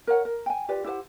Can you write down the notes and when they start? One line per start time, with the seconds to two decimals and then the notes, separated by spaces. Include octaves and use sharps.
0.07 A#4 C#5 F#5
0.25 A#4
0.46 G5 G#5
0.68 F4 G4 B4 D5
0.84 E4 G4 C5 F#5